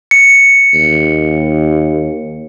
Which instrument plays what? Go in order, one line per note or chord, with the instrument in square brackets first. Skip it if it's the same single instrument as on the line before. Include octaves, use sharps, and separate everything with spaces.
[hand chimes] C#7
[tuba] D#2